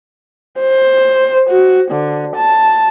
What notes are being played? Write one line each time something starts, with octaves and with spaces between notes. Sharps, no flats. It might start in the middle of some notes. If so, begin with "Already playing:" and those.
C5
F#4
D3
A5